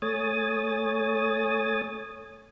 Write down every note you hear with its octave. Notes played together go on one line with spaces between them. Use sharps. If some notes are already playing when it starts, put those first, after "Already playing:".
A3 C#5 G#5 D#6 A6